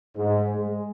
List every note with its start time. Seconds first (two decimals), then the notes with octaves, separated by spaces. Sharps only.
0.16 G#2
0.53 G#3